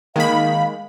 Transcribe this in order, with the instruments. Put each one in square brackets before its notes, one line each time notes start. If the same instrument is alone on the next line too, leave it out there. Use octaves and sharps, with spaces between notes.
[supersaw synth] D#3 B5 [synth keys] G#3 A#3 [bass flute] F5